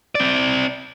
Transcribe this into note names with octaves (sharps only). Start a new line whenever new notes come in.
C4 D5